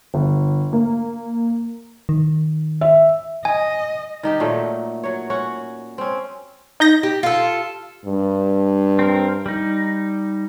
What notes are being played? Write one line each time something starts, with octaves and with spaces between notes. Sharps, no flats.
G1
A#3
D#3
E5
D#5 G#5
D#3 D#4 G4
A#2 F#3 A3
F#3 C#5
C#4 F#4 C#5
C4 C#4
D#4 G6 A#6
G4
F4 A4
G2
C4 A#4
G3 D#4